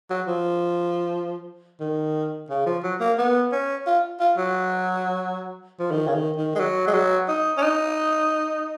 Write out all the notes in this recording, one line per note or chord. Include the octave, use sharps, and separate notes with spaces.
F#3
F3
D#3
C#3
F3
F#3
A#3
B3
C#4
F4
F4
F#3
F3
D#3
C#3
D#3
D#3
G#3
F#3
G#3
F#3
D#4
C#4
D#4